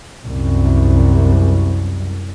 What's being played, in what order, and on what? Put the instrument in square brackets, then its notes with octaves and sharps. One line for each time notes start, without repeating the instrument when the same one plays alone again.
[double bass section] C2 F#2